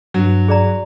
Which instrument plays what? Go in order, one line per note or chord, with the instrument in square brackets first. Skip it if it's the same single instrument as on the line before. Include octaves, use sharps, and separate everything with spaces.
[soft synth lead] G2 [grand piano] F#3
[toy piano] G#4 D5 A#5